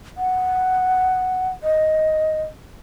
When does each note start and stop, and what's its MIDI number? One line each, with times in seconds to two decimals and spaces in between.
0.18 1.50 78
1.64 2.42 75